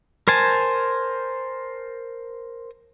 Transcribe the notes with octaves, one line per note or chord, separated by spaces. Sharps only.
A#4 C5 G#5 A5